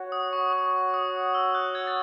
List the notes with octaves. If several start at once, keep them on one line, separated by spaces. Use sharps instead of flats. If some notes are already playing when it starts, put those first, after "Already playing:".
Already playing: F#4 C#5 F#5
D#6
C#6
D#6
D#6
E6
F#6
G#6
A6